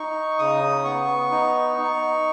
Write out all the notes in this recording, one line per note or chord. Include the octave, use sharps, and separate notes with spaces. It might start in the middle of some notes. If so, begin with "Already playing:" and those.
Already playing: D#4 C#6
C#3 D#6
B3 C#6
D#4
D#4